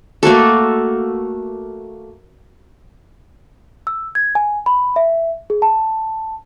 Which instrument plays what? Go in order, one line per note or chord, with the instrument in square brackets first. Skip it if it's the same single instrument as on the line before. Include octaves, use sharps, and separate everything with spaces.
[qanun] A3 A#3 F#4 A4
[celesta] E6
G#6
G#5
B5
E5
G#4
A5